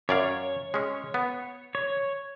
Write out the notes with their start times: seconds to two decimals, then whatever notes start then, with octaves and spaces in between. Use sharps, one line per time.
0.09 F#2 C#5 D5 F5
0.74 G#3 C#4
1.14 B3
1.75 C#5